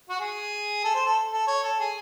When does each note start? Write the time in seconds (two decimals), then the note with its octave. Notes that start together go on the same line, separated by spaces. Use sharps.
0.09 F#4
0.20 G#4
0.84 A4
0.94 C5
1.05 A4
1.32 A4
1.48 C#5
1.64 A4
1.80 G#4